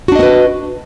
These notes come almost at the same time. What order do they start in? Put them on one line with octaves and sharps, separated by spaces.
F#4 D4 D#5 B3 B4